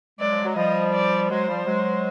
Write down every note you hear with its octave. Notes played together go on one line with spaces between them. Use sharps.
F#3 G#3 D5
F3
F#3
F3 G3 D#5
D5
F#3 G#3 C5
F3 G3
F#3 G#3